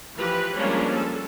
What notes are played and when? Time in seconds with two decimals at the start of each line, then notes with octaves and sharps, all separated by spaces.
0.15 E3 F3 G4 B4
0.53 F3 G3 G#3 A#3 C#4 D4
0.90 A4